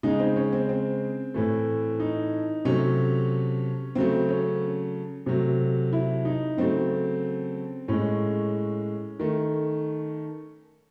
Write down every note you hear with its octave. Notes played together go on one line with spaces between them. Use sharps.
C#3 G#3 D#4
C4
C#4
C4
C4
A2 E3 A3
D#4
C3 F#3 A3 C#4
C#3 F#3 A3 C4
C#4
C3 F#3 A3
E4
D#4
C#3 F#3 A3 C4
A2 G#3 C#4
D#3 A3